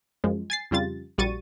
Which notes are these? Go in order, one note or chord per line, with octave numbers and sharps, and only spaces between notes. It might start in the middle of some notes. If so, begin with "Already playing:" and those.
F#2 F3 G#3
G#5 A6 C7
F2 C#3 G3 F4 A6
A#1 G3 F#4 C#6 A6 D#7